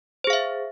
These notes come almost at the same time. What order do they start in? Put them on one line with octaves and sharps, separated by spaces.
C5 G#4 F5 E5